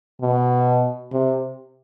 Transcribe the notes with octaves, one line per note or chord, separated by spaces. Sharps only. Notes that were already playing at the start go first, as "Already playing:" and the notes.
B2
C3